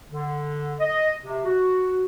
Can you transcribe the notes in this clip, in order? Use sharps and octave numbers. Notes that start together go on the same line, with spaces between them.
D3
D#5
C3
F#4